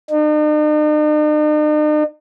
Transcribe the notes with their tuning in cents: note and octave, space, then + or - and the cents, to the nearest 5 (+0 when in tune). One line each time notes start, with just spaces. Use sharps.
D#4 -45